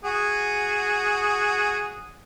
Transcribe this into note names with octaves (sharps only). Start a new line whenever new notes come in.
F#4 G#4